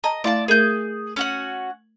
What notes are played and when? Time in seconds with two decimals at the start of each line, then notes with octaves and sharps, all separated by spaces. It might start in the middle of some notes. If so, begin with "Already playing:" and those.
0.04 D#5 A5 A#5
0.24 A3 E4 D5 F5 A5
0.48 A3 G#4 A#4 G6
1.16 C#4 F#4 F#5